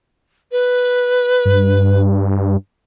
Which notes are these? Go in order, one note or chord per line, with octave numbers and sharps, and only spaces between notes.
B4
G2